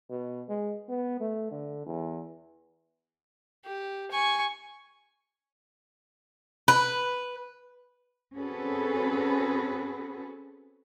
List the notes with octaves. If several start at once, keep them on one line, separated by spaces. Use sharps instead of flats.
B2
G#3
B3
A3
D3
E2
G4
G#5 C#6
B4
C4 C#4 F#4 G#4 A4 B4